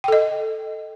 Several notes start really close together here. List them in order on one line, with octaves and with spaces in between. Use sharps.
G5 A4 D#5